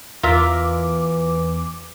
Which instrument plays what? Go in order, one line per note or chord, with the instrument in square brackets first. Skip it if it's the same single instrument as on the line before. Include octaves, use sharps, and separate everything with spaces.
[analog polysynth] E2 D6 [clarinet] E3 [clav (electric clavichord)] F4 A#4 E5